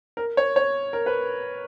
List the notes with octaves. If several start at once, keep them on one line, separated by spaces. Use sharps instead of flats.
A#4
C#5
C#5
A#4
B4